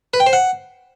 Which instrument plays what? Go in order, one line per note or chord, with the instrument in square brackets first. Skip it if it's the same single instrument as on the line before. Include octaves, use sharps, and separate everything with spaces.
[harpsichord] B4
G5
C5
F#5